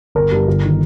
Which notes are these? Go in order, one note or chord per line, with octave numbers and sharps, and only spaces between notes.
G1 A#4
G2 G3
G1
D#3